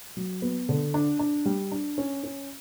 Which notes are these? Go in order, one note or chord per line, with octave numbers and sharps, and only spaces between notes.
F#3
B3
D3
D4
D4
G3
D4
C#4
C#4